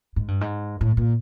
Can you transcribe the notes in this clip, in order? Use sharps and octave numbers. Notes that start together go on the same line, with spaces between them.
G#2
G2
G#2
A2
A#2